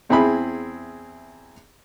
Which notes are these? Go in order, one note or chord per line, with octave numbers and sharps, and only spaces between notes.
E2 C4 E4 G#4 B5